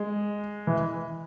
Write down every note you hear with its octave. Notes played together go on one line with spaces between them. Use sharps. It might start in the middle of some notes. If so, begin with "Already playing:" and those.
Already playing: G#3
E3